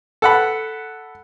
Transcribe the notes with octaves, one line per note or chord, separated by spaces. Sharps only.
A4 F#5 B5